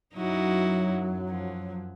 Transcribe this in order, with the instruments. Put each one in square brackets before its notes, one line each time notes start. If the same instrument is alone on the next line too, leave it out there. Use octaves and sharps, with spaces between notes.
[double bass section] F#2 F#3 [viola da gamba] D#4 E4 F#4
[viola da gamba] F3